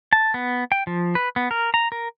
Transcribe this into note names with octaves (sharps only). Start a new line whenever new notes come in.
A5
B3
G5
F3
B4
B3
A#4
A#5
A#4